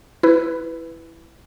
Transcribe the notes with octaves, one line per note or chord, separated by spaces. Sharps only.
E4 B4